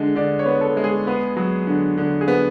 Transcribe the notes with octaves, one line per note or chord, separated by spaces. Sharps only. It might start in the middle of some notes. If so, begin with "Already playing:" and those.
Already playing: D3 G#3
D3 D5
C#5
B3
A4
G#3
G#4
B3
F#3
D3
D3
G#4
B3